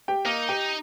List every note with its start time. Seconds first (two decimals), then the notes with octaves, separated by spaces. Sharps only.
0.08 G4 G5
0.25 A#3 D#4 A#4
0.49 G4 G5